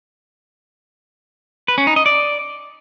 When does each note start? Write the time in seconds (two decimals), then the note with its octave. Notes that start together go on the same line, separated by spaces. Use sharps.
1.68 B4
1.78 C#4
1.87 D#4
1.96 D#5
2.06 D5